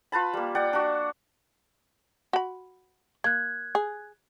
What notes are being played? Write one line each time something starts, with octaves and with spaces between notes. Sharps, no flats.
F4 B4 A5 B5
G3 A#3
D5 F#5 G5
D4 F#4
F#4 B5
A#3 F#6 G#6
G#4